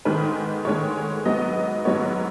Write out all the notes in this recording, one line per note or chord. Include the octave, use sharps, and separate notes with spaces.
G#2 D#3 G#3 B4
G#2 D#3 G#3 C#5
G#2 F#3 B3 D#5
G#2 F#3 B3 C#5